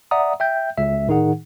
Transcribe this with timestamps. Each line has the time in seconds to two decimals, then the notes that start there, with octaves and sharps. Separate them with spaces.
0.11 D5 E5 F#5 A#5 D#6
0.40 E5 G5 G6
0.78 C#2 E5
1.08 A2 D#3 D#4 G#4 F#5